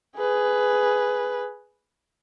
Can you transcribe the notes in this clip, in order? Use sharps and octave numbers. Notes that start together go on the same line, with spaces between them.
G#4 B4